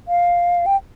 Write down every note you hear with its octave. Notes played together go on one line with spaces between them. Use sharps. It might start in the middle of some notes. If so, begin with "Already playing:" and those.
F5
G5